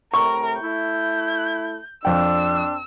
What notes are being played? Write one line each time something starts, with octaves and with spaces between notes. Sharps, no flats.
A2 C3 A3 A#4 C#6
A3 E4 G6
F2 C4 D4 G5 E6